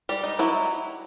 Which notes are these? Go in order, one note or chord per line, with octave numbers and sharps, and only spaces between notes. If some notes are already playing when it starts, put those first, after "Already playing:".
G3 G4
D#4
F#3 E4